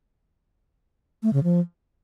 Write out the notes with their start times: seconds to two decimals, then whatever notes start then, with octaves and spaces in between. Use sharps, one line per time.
1.23 A3
1.33 C#3
1.43 F3